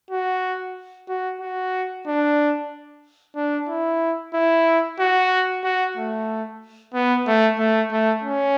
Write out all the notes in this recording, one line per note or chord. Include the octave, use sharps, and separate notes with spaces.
F#4
F#4
F#4
D4
D4
E4
E4
F#4
F#4
A3
B3
A3
A3
A3
C#4